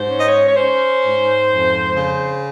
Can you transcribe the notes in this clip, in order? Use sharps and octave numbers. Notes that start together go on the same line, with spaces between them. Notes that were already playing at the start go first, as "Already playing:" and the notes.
Already playing: G#2 C5
C#4
D#5
C#5
C#5
C#4 C5
G#2
F2
C#3